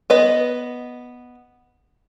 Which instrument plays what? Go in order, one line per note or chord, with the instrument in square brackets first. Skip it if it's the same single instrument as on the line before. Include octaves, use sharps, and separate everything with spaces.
[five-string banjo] B3 B4 D#5